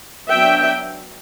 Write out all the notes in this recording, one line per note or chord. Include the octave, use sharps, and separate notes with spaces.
F#3 B3 D4 E5 G5